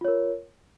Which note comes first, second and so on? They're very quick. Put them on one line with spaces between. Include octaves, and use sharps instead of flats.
F4 C#5 A#4